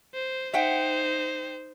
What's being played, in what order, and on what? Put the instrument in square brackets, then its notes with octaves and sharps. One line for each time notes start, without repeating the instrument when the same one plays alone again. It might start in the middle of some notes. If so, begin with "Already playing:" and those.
[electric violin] C5
[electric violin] D#4 C5 [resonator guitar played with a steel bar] E5 F#5 G5